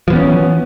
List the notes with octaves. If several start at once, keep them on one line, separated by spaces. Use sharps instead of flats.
E3 F3 B3 C#4